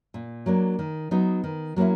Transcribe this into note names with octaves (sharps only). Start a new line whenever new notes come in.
A#2
F#3 A#3 D4
D#3
F#3 B3 D#4
D#3
F#3 A#3 C#4 E4